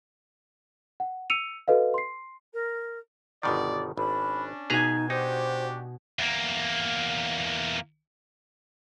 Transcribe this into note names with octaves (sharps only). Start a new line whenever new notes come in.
F#5
E6 C#7 D#7 F7
F#4 A4 B4 D#5 F5
C6 C7
A#4
G1 B2 D#3 D5
G#1 C#4 D4 B5
B2 D#4 G#4 B4 G#5 A#5
D4 D#4 F#4 G4 C5
E2 A#3